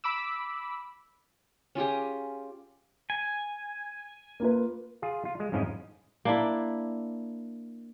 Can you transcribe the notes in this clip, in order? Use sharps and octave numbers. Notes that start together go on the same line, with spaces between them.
B5 D6 E6
C#4 F4 G4 G#4
G#5
A#3 F4 B4
F4 G#4
F4
G#3
F2 G#2 F3 C#4 E4 D#5
A#3 D4 E4